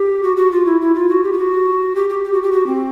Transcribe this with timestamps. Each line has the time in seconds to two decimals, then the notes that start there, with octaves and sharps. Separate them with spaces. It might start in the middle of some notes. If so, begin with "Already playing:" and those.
Already playing: G4
0.23 F#4
0.37 F#4
0.52 F4
0.66 E4
0.81 E4
0.95 F4
1.09 F#4
1.24 G4
1.33 F4
1.38 F#4
1.95 G4
2.09 G4
2.24 G4
2.33 F#4
2.43 G4
2.52 F#4
2.66 C4